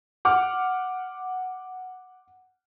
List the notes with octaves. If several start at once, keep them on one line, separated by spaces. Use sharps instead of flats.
F#5 D6 F6